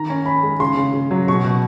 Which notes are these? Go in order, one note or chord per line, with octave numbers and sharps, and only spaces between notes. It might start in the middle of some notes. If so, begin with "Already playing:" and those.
Already playing: D#3 A#5
C#4
C#4 B5
G#3
C#3 C6
C#3
C#3
F#3
B2 C#6
B2